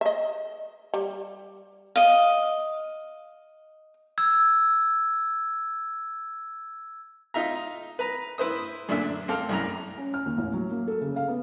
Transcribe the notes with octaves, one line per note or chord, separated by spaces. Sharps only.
D#5 E5
G3
D#5 F5
E6 G#6
D#4 F4 E5 A#5
B4 A#5
E4 B4 C5 D#6
F#2 A#2 D3 D4 E5
A#3 C4 A4 F6
C2 F#2 A#5
C#4
F6
D#2
A1
F#3
A#3
A4
C#3
F5
B3